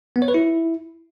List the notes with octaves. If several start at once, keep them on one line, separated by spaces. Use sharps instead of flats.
B3
C#5
B4
E4